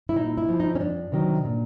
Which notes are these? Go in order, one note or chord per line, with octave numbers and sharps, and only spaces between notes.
E4
A#2 D#4
E4
F3
D#4
C#4
F2 D4
C3 D#3 F#3
A#2